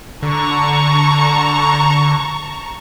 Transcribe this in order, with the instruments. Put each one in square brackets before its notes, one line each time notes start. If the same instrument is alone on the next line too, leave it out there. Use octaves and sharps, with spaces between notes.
[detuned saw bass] D3 [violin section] A5 A#5 C#6